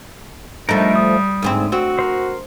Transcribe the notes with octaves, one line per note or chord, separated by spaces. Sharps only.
F3 G3 A3 D4 D#4 A#4
D#6
D2 G#2 C4
C4 F#4
A#4 C5